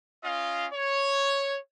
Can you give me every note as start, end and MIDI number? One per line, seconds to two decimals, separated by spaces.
0.23 0.66 61
0.23 0.66 65
0.23 0.66 75
0.23 0.66 77
0.73 1.57 73